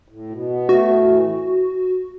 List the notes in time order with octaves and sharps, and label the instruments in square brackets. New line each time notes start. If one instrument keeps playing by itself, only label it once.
[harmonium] A2
B2
B3
[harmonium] A3 [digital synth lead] F#4
[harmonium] A2
E3